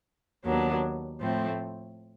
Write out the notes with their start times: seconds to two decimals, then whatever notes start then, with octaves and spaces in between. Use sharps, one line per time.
0.45 D#2 D#3 F#3 B3 D4
1.21 A2 F3 A3 C4